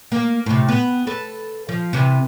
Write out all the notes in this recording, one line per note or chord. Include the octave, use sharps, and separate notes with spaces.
A#3
A2 C3
B3
A4 B4
F3
C3 E3